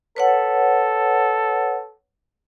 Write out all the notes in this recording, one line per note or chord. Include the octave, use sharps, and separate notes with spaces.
A4 B4 C#5 F#5